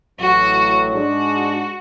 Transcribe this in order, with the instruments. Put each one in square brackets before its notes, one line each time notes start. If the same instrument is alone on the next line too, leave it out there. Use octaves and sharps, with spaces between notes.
[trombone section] A1 A2 F#3 [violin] F#4
[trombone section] G#2 G#3 D4 G#4 [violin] F#4